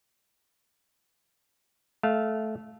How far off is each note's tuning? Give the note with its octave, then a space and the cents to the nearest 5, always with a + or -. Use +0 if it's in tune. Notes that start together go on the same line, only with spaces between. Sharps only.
A3 -15 F5 +0